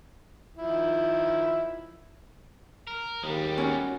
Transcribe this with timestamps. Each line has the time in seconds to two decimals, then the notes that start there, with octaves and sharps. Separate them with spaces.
0.57 D#3 F3 E4
2.87 A#4
3.23 D#2 G3 G#3
3.58 C#4 E4 F#4